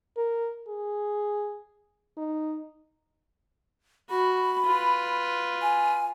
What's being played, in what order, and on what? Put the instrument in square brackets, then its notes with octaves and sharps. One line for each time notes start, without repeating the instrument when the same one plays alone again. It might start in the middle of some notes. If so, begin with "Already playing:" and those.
[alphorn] A#4
G#4
D#4
[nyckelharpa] F#4 [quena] B5
[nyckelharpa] F4 B4
[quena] G#5